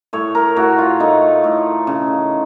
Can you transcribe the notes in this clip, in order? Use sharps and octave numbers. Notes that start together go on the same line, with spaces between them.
A2 C#5
A#4
A2 F#4
F4
A2 D#4
A2
C#3